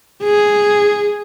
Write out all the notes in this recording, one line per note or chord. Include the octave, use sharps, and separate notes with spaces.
G#4